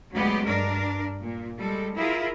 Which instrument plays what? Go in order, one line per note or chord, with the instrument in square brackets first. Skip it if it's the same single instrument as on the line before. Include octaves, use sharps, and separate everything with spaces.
[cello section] D2 F#3 G#3 B3 G4
G2 D4 A#4
A#2
G3 G#3 A4
E4 F4 G#4 A#4